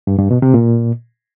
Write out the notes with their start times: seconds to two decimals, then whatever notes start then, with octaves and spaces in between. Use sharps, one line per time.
0.07 G2
0.19 G2
0.31 B2
0.42 C3
0.54 A#2